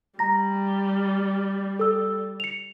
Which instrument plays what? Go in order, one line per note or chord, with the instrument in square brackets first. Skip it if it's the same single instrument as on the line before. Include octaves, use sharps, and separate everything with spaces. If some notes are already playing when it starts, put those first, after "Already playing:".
[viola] G3 [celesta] A#5 A#6
[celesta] A4 E6
C#7 F7